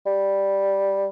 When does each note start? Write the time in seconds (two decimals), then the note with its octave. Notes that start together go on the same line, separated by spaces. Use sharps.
0.06 G3